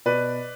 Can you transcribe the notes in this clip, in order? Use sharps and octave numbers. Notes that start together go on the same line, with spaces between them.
B2 B4 D5